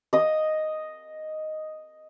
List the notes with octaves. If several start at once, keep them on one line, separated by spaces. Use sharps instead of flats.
D#5 D#6